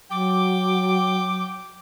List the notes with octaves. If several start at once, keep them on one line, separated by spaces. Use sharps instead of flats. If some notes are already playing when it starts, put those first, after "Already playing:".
F#3 G5 D6